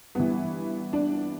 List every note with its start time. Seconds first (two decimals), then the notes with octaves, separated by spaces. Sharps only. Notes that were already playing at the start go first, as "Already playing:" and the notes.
0.15 G2 E3 B3
0.93 D4